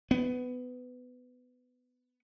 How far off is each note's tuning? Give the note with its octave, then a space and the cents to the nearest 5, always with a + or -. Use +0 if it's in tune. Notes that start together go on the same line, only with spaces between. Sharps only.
B3 +20